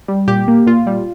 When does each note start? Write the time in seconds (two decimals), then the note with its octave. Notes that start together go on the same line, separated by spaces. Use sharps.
0.08 G3
0.28 A#2 G4
0.48 A#3
0.67 A#2 F4
0.87 G3